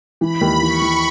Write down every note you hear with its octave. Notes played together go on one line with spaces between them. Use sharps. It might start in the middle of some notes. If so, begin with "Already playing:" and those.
E3 B5
D#2
E3 C#6
E3